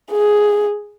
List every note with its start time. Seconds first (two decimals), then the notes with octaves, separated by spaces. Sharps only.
0.12 G#4